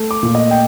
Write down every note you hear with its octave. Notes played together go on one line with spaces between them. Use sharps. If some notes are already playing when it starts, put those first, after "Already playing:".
Already playing: A3
D6
A#2
D#5
G5